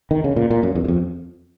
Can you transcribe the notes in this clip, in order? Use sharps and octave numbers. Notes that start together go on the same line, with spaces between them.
D#3
C#3
A#2
A#2
F#2
E2
F#2
F2